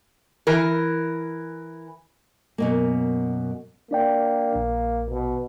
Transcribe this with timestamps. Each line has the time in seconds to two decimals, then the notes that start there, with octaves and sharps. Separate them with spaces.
0.47 E3 A#4
2.58 F#2 B2 A#3
3.91 A#3 D4 D5 G5
4.55 A#1
5.09 B2